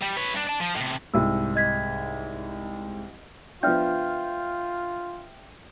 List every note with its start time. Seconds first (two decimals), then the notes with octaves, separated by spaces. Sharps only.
0.02 G3
0.17 B4 C#5
0.35 G2 D4
0.47 D5 A5
0.61 F3
0.77 A2 C3
1.14 C2 G#2 E6
1.55 D#5 G#6 B6
3.63 F3 B3 D4 F4 E5 G5 F6 G6